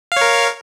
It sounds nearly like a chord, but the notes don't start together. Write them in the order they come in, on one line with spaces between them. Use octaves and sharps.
F5 C#5 A#4